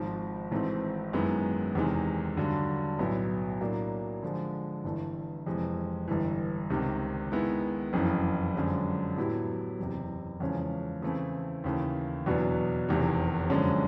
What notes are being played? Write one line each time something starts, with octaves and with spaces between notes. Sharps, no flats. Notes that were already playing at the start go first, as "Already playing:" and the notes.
Already playing: G#1 G#2 F3
G#1 G#2 E3 A3 C4
F#2 D#3 G#3 B3 E4
E2 C3 D#3 G#3
G2 D3 F#3
B1 A2 F#3 B3 E4
A2 F#3 A#3 D4
D3 F3 G#3
G1 G2 E3 A3
F2 C3 E3 G#3
G1 G2 E3
C#2 C3 D#3
D#3 G#3 B3 E4
F#1 F2 C#3 E3
F#2 D3 F3 G#3 C#4
A2 F#3 B3 E4 G4
F#1 E2 C3
E2 C#3 F3 G#3 C#4
C#3 E3 A3 C4 E4
D#2 C#3 E3 A3
E2 B2 F#3 B3 D4
F1 E2 C3 D#3
F#2 D3 F3 G#3 C#4